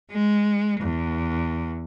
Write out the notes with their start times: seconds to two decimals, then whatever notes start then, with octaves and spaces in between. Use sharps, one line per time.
0.11 G#3
0.81 E2